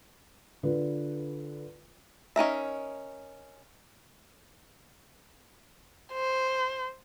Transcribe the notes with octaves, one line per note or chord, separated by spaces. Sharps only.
D3 F4 B4
C#4 D#4 A#4 E5
C5